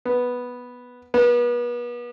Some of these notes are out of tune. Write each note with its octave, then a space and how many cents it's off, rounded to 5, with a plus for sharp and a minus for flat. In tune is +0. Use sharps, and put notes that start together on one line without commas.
B3 -5
B3 -35